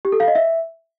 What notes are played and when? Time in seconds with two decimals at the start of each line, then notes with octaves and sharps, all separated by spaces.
0.05 G4
0.12 A4
0.20 F5
0.28 D#5
0.35 E5